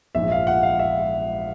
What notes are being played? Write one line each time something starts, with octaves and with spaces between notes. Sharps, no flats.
A#1 G#2 F3 E5
F5
F#5
F5
E5